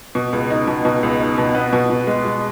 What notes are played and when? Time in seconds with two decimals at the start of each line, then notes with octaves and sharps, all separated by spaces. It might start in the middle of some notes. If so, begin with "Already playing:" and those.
0.15 B2
0.33 C#2
0.50 D#4
0.67 B2
0.85 B2
1.03 C#2
1.20 D#4
1.38 B2
1.55 B3
1.73 B2
1.90 B2
2.07 G#3
2.25 G#3